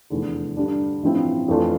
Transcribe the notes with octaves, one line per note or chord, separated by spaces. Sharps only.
F1 E2 D3
G2 D3 G3 D4
A1 G2 F3 C4 E4
F2 E3 A3 D4 F4